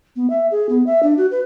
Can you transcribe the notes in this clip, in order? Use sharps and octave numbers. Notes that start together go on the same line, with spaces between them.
B3
E5
G#4
B3
E5
D4
F#4
B4